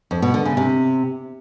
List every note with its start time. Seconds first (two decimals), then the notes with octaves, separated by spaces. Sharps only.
0.11 F2
0.22 B2
0.34 D3
0.45 C#3
0.57 C3